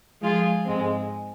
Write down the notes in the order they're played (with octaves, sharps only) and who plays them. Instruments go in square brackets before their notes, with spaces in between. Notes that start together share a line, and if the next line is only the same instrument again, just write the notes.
[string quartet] F3 G#3 F4 G#4
G#2 G#3 C4